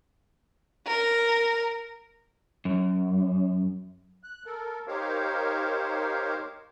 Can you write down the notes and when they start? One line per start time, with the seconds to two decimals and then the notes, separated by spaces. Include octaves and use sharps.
0.87 A#4
2.65 F#2
4.23 F#6
4.46 A4 A#4
4.88 D#4 G4 A#4 C5 C#5 F5